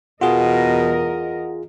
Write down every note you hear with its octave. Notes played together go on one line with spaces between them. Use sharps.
E2 B2 F4 G#4 A#4 D#5 F#5